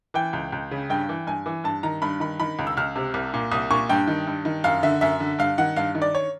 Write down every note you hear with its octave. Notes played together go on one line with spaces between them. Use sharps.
E3 G5
C#2
C#2
C#3
G2 G5
E3
G2 G#5
E3
G2 A5
D#3 A#5
G2 B5
D#3 B5
D#3 B5
C#2
E6
C#2 F6
C3
C2
A#2
C2 D#6
A#2 C#6
G2 G5
D#3
G2
D#3
F#2 F5
D3 E5
F#2 E5
D3
G2 F5
D#3 F#5
G2 F5
D#3
D5
C#5